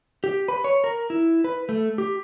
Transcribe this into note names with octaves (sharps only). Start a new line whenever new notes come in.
G4
B4
C#5
A#4
E4
B4
A3
G4